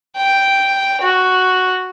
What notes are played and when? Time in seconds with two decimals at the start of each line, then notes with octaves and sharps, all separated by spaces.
0.17 G5
1.02 F#4